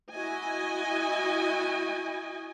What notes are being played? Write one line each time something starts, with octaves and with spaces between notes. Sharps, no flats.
E4 F#4 D#5 G#5